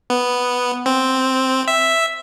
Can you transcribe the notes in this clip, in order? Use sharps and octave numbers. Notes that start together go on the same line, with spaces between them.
B3
C4
E5